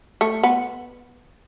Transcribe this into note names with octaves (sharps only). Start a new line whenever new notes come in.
A3
B3